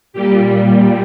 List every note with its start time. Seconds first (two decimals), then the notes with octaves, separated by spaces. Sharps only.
0.13 A#2 G3 G4